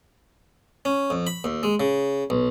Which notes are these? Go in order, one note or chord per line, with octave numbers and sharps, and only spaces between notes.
C#4
F2
B5
D#2
G#3
C#3
B1